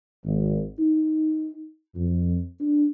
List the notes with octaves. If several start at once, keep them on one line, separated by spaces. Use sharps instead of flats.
G#1
D#4
F2
D4